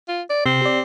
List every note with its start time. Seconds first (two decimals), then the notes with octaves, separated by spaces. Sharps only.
0.08 F4
0.30 D5
0.46 C3 C4
0.62 G4 D5